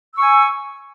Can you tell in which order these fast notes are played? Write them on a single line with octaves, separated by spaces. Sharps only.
E6 C#6 G#5